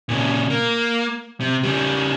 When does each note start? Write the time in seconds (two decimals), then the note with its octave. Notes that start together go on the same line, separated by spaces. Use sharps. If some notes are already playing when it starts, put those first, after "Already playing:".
0.09 A#2 C#3
0.50 A#3
1.41 C3
1.64 C#3 G3